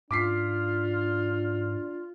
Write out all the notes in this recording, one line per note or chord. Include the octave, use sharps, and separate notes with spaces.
G#2 D4 F4 D6 B6 C7